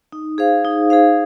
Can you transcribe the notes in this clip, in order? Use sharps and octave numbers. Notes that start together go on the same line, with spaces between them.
D#4
G#4 C5 F5
D#4
G#4 C5 F5